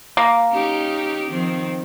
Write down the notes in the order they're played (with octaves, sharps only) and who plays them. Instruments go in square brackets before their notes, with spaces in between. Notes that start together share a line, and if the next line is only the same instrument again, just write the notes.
[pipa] A#3
[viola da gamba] C#4 D#4 G4
D#3 F3 C4